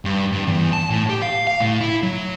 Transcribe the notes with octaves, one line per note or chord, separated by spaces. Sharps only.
G2
G2
E2
A5
A2
G4
F5
F5
A2
E4
F#3